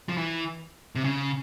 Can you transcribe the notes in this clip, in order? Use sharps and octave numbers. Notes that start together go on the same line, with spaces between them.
F3
E3
C3
C#3